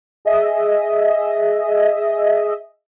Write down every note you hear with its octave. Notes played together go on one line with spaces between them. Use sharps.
G#4 D#5 E5